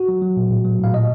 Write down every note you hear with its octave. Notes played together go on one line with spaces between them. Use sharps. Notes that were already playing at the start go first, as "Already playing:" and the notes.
Already playing: F#4
F#3
F#3
A#2
A2
F#3
A2 F5
A#2 D#5